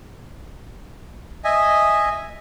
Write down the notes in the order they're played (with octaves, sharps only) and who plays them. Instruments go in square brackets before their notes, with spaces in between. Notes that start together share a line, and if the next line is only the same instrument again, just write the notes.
[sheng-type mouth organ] D#5 E5 G#5